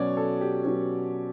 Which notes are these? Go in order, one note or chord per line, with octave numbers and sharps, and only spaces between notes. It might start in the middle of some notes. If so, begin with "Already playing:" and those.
Already playing: B2 F#3 C#4 C#5 D5
A4
G4
B2 F#3 C#4